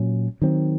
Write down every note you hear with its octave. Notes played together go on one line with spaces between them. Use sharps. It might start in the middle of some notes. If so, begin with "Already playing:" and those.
Already playing: A#2 F#3 C#4
D#3 F#3 C4